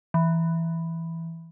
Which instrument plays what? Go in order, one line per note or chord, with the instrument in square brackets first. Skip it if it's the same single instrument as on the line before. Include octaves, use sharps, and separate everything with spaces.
[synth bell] E3